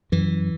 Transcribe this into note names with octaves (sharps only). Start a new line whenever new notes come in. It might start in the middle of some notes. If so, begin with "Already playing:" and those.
F#2 E3